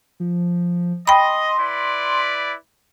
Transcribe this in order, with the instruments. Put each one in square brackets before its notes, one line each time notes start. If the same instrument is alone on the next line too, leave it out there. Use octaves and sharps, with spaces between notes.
[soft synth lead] F3
[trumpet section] D#5 [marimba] G5 B5 [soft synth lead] C6
[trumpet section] E4 B4 D5